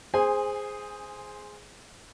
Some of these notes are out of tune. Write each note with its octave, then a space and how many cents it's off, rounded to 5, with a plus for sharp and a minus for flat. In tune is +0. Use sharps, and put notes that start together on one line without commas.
G#4 +0 C5 +0 G#5 -25